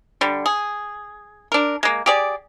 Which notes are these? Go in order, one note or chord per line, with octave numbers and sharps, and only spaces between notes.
D3 G3
G#4
D4 A#4
G#3 A#3
G4 G#4 D5